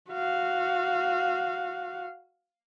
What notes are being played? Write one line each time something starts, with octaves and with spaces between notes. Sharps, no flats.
F#4 F5